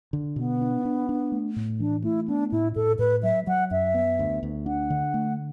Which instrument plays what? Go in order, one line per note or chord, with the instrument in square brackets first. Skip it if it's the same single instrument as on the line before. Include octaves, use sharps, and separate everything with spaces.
[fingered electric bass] D3
[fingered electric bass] B2 [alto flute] B3
[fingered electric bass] D4
D4
D4
A3
A2
[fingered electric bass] E3 [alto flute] D4
[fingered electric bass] A3 [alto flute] E4
[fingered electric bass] B3 [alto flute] D4
[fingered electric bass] A2 [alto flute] E4
[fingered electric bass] A2 [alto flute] A4
[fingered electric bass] A2 [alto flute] B4
[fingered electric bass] F#3 [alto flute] E5
[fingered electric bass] F#3 [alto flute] F#5
[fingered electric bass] F#2 [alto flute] E5
[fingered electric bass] B3
D2
D2
[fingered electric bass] D4 [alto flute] F#5
[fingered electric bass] D3
A3